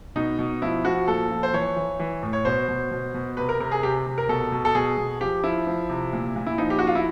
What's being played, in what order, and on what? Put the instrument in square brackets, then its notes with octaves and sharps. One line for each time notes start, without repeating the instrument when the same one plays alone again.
[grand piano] B2 D#4
B2
F3 E4
F3 F#4
A#2 A4
F3
C5
E3 C#5
E3
E3
A2
C#5
B2 C5
B2
B2
B2
C3 B4
A#4
C3 A#4
G#4
C3 G4
C3
A#4
B2 A4
B2
A4
B2 G#4
B2
F3 G4
F3 E4
F3
C3
A#2
A#2
E4
F3 D#4
G4
F3 F#4
F4
E4